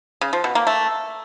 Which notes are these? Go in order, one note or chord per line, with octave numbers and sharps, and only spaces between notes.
C#3
F3
B2
A#3
A3